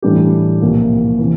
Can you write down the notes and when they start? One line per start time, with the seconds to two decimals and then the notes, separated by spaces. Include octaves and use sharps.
0.02 A2 E3 G3 D4 G4
0.61 C2 A#2 F3 A#3
1.19 C3 E3